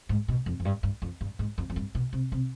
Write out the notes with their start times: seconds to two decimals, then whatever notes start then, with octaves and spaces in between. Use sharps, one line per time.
0.09 G#2
0.28 B2
0.46 F2
0.60 F2
0.65 G2
0.83 G2
1.02 F2
1.21 G2
1.39 G#2
1.58 F2
1.70 F2
1.76 G2
1.95 B2
2.13 C3
2.32 C3